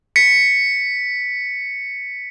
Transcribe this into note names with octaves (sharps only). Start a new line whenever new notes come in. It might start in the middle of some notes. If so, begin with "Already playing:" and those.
B6 C#7